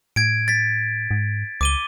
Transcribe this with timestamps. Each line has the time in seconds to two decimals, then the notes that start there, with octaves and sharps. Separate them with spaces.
0.16 A2 G#6 D7
0.48 A6 B6
1.11 G#2
1.61 C#2 D6 D#7 G7